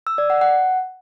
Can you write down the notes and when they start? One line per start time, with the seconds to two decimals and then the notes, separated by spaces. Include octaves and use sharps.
0.07 E6
0.18 D5
0.30 F#5
0.41 F#5